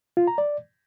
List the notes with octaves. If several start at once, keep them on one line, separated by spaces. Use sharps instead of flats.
F4
A#5
D5